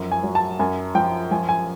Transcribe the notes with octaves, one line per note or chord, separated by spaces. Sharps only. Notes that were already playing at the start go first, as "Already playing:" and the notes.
Already playing: F#2 F3
G#5
F#3
A5
F#2 G#5
F3 G5
F3 G#5
G#5